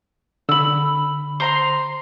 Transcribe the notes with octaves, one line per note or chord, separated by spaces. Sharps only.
D3 B5 E6
C5 A#5 C6